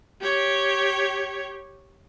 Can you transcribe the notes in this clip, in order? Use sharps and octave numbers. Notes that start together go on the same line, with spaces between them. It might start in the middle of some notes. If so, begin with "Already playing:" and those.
G4 C#5